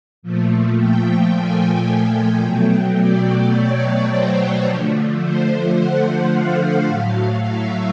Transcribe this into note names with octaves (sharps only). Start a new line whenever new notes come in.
A#2 F3 A3
G5
G#5
G5
B2 F#3 A3
D5
C#5
C5
D3 F3 A3
C5
F#5
F5
A2 F#3 A3 F5
E5